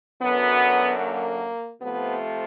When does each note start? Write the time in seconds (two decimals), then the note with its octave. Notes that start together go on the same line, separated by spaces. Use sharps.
0.22 F#2 D3 F#3 B3
1.01 A#3
1.80 C3 F3 A3 B3